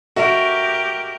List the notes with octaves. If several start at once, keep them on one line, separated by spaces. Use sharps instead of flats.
F#4 G4 A#4 E5